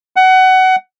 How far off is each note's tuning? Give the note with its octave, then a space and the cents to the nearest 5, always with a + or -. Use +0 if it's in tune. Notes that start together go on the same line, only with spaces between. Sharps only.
F#5 +20